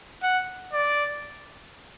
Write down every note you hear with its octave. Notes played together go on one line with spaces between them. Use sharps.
F#5
D5